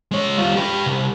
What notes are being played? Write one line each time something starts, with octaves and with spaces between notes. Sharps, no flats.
G#3 C#5
G3 F4
G4 B4
C2